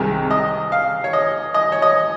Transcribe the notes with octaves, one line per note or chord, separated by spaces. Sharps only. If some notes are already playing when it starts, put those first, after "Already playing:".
Already playing: C2 C3 D#3 G#3
D#5
F5
C#5
D#5
D#5
C#5
D#5